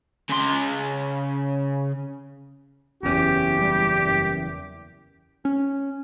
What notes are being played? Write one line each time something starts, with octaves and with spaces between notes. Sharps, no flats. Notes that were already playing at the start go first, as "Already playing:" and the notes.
C#3 C6
F#1 E2 C#4 G4
G3
F#2
C#4